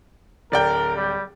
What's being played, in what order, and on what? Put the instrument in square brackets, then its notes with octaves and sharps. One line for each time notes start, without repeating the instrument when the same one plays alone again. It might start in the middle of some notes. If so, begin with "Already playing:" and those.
[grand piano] D1 D5 G5 [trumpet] A#4
[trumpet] G3